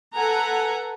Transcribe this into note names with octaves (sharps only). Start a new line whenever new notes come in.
A4 B4 F#5 G#5 A#5